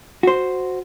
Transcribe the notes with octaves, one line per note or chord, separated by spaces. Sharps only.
F#4 C5